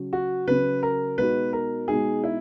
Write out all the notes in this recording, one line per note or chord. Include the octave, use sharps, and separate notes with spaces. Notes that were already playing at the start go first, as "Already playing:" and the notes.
Already playing: C#3 F#3 C#4
F#4
C#3 F#3 C#4 B4
A#4
B2 G#3 D#4 F#4 B4
A#4
B2 G#3 D#4 F#4 G#4
E4